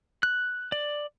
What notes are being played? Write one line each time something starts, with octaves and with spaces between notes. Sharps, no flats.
F#6
D5